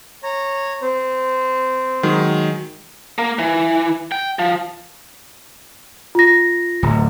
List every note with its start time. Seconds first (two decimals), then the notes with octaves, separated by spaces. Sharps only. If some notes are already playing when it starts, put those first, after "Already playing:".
0.23 C#5 A#5
0.82 C4 C5
2.03 D#3 F#3 G#3
3.18 A#3
3.39 E3
4.12 G5
4.39 F3
6.15 F4 A#6
6.83 D1